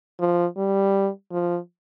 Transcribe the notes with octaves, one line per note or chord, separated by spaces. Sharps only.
F3
G3
F3